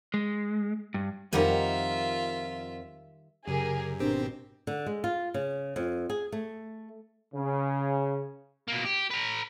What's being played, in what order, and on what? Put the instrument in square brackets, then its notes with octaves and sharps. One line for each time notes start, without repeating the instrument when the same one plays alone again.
[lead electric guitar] G#3
G2
[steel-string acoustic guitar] F2 A#4 F#5 [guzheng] D#3 G3 G#5 [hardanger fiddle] F4 E5
[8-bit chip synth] F#2 [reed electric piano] C#3 [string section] G4 G#4 A#4
[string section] G#1 B2 C5 [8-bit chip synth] C4 G4 [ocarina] D4 [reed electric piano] A#4
[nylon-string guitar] D3
G#3
F4
C#3
F2
G#4
A3
[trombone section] C#3
[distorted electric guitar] B2 A#3
G4
B4 A#5